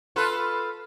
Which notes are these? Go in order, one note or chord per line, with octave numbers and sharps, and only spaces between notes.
F4 A4 B4